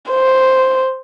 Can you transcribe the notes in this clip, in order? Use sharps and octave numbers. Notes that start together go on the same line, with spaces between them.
C5